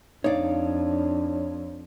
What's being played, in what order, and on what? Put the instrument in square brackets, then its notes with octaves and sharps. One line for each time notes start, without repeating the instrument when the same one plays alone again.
[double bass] F2 [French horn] D4 [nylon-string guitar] D#4 D5 [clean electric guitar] C#5 F5